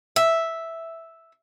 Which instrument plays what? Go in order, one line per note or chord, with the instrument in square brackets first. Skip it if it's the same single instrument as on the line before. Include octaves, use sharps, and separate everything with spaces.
[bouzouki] E5